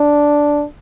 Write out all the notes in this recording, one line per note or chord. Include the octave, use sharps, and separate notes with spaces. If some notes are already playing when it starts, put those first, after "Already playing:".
Already playing: D4